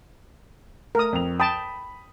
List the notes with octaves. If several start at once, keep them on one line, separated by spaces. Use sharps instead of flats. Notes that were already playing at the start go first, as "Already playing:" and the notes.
A3 A#4 D#6
F2 F7
G5 A5 B5 D#6